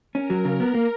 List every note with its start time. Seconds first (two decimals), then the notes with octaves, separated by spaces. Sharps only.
0.15 C#4 A#4
0.30 F#3
0.45 C#3
0.60 B3
0.74 A#3